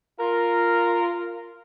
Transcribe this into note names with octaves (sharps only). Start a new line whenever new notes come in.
F4 A#4